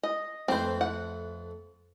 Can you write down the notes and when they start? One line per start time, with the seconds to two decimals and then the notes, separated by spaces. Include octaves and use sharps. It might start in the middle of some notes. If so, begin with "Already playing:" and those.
0.03 D#5
0.48 F2 A3 C4 B4 C5
0.81 F#5